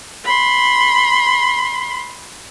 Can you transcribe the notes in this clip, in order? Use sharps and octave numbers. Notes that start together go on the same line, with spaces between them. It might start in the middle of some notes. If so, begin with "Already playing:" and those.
B5 C6